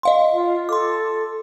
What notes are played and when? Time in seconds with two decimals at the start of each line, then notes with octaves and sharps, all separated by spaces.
0.03 D#5 F5 C6
0.33 F4
0.69 A4 C6 D6